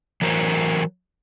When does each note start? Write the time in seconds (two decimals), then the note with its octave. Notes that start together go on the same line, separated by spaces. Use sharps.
0.22 E3 F#3 A#4 C5